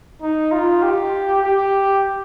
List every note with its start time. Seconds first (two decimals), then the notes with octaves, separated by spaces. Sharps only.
0.22 D#4
0.52 F4
0.82 G4
1.43 G4